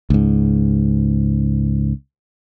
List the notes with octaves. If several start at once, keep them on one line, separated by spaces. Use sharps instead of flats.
C#2 G#2